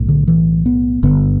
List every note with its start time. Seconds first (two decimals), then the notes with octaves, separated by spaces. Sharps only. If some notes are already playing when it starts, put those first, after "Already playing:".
Already playing: B1 A2
0.08 D3
0.27 E3
0.66 B3
1.03 G1 G2 D3 B3